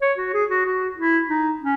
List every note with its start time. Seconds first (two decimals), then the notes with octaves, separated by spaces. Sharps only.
0.02 C#5
0.18 F#4
0.34 G#4
0.50 F#4
0.66 F#4
0.97 E4
1.29 D#4
1.61 C#4